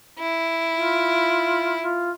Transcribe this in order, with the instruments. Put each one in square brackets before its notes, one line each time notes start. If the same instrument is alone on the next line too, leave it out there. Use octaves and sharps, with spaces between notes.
[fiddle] E4
[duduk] F4
F4